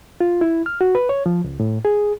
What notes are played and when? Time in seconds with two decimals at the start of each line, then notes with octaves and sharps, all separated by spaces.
0.21 F4
0.41 E4
0.66 F6
0.81 F#4
0.95 B4
1.09 C#5
1.26 F3
1.44 C#2
1.60 A2
1.85 G#4